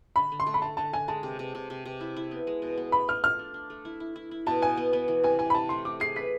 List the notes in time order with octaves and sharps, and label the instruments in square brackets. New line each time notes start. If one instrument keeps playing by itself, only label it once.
[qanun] D3 [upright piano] B5
[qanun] D3
[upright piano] C6
[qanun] A3
[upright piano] B5
[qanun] A3 [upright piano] A5
[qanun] D3 [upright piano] A5
[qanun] D3 [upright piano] G#5
[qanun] G#3 [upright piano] A5
[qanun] C3
C3
C3
C3
C3
E4
E4
B3
G#3
B2
B3
[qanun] A3 [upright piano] B5
[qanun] A3 [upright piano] F6
[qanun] F4 [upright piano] F6
[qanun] D4
D4
A3
E4
E4
E4
E4
[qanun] B2 [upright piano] A5
[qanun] B3 [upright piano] G#5
[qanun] B3
B3
E3
[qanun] C3 [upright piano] G#5
[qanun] C3 [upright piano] G#5
[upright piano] B5
[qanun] C3 [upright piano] A5
[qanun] A3 [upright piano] C6
[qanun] A3 [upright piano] D6
[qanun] G#4 [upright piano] C7
[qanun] B4 [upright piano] B6